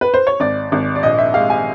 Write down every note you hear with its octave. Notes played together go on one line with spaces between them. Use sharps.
B4
C5
C#5
G#1 D5
G#1
D5
A#1 D#5
E5
G#3 F5
G#5